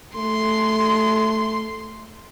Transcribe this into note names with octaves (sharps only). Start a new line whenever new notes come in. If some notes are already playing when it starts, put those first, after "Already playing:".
A3 C6